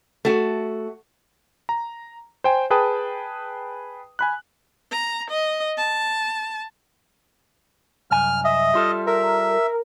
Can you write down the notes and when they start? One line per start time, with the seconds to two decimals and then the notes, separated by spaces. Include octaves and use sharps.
0.25 A3 F#4
1.69 A#5
2.44 C5 G5 G#5
2.70 G#4 B4 G5 A5 D#6
4.19 G#5 B5 F#6
4.91 A#5
5.30 D#5
5.77 A5
8.11 C2 F#2 G#5 F6
8.44 D#5 E5
8.74 G3 F4 A4
9.07 A#4 E5